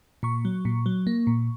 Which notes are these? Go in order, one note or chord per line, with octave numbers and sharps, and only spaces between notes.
A#2 C#6
F#3
A#2
F#3
A#3
A#2